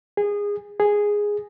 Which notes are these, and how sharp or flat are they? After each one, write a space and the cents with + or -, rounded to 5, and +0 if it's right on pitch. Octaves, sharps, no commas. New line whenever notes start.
G#4 -20
G#4 -5